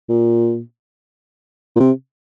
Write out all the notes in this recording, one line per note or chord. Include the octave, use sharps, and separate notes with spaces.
A#2
A#2
C3